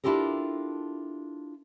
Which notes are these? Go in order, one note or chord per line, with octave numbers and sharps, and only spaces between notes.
D4 E4 F4 G4 A4 A#4